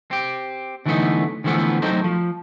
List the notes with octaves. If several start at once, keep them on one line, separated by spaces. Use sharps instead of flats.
C4 G4
D3 E3 F#3 A3 B3 D#4
D3 E3 F3 A3 B3 C4
F#3 A3 C4 D#4 C5
F3